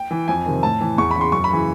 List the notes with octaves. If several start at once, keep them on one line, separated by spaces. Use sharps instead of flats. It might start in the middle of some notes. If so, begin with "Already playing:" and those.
Already playing: G5
E3
F2 G#5
C3 D#3
A2 A5
E3
E2 C#6
C#3 E3 B5
C6
F#2 C#6
B5
C#3 E3